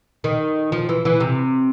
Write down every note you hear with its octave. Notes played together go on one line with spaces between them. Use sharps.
D#3
F3
E3
E3
C3